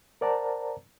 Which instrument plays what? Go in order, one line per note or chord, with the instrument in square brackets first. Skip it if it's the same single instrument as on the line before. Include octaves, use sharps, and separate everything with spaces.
[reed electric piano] A#4 C5 D5 F#5 A5 A#5